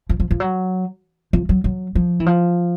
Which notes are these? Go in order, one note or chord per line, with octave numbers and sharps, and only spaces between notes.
F3
F3
F3
F#3
F3
F#3
F#3
F3
E3
F3